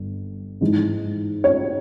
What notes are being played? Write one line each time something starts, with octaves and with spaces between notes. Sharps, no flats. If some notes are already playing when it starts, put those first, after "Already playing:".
Already playing: G1
G#2 E3 G#3
C#5